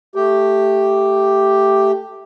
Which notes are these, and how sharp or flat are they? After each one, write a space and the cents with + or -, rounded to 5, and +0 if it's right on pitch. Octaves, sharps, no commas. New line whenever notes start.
A3 +0 G4 +0